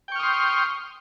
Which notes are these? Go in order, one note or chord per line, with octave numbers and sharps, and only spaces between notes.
G5 C6 C#6 D#6 F6